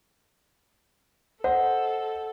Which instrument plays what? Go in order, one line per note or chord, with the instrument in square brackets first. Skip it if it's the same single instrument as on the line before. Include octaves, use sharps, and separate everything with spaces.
[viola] A4 [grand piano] C5 D#5 [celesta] F#5